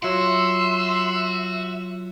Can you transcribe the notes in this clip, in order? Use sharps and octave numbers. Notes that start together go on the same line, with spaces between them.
F#3 F4 F#4 E5 C6